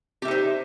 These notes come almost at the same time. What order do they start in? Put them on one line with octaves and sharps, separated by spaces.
G4 E5 D#4 C5